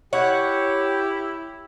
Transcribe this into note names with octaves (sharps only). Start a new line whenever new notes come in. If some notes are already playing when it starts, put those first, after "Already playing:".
E4 G4 C#5 F#5